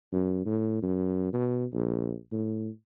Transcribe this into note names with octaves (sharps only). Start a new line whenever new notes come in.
F#2
A2
F#2
B2
A#1
A2